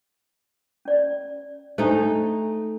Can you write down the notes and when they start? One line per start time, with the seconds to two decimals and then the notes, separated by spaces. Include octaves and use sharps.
0.85 C#4 D5
1.78 A3 D4 D#4 C5